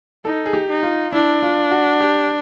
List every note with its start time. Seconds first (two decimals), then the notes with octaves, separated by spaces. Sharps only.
0.25 D#4 A4
0.46 G#4
0.53 G4
0.69 D#4
0.83 F4
1.12 D4 E4
1.42 F4
1.71 F#4
2.01 G4